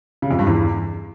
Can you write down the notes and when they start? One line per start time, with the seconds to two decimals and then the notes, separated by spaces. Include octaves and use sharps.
0.22 C#3
0.31 F2
0.39 G2
0.47 E2